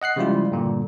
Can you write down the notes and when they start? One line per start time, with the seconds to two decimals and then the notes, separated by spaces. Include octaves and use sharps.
0.02 D#5 F#5 F#6 C7
0.16 C#3 F3 G3 G#3 E4 F4
0.52 G2 A#2 D3